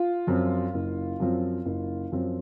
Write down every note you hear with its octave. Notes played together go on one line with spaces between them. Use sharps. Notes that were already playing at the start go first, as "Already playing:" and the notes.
Already playing: F4
F#2 F3 C4
F#1
F#2 F3 C4
F#1
F#2 F3 C4